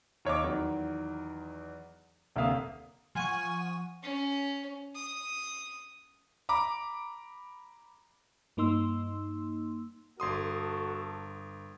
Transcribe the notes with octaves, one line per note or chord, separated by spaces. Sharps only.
D#2 C#5 D#5 D6
E2 D#3 F#3
F1 D2 A#3 E5 F5 D#6
F3 F#5 G#5 C#6
C#4
D#6
A#5 B5 D6
G2 A#3 D#4 C6 E6
G1 F#4 A4 C6 D#6